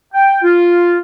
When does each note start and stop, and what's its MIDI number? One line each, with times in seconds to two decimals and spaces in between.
0.14 0.40 79
0.43 0.98 65